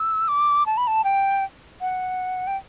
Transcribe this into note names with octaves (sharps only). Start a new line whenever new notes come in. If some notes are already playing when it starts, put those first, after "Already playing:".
Already playing: E6
D6
A5
B5
A5
G5
F#5
G5